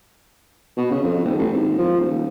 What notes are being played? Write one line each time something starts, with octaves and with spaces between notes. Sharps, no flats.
B2
C#3
F2
D#1
A1
G#1
F3
D#1